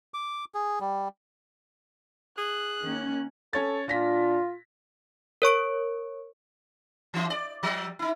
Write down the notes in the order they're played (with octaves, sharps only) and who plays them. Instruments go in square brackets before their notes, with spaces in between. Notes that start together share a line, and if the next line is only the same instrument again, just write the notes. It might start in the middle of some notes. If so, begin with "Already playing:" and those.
[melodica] D6
G#4
G3
[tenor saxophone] G#4 [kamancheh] F#6
[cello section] D#3 A#3 C#4
[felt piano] C#4 C#5 A6 [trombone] A4
[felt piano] A#2 A#6 B6 [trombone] D4 [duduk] F4
[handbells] A#4 C#5 C#6 D7
[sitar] E3 E4
D5
F3 G3
D#4 E4